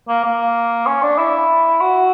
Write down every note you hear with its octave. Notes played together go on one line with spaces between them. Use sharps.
A#3
A#3
C#4
D4
E4
F#4